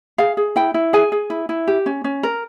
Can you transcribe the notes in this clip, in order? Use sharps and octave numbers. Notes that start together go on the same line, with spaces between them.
G#4 F5
G#4
E4 G5
E4
G#4 G#5
G#4
E4
E4
G4
C#4
C#4
A#4